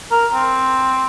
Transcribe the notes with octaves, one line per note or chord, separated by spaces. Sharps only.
A#4
C4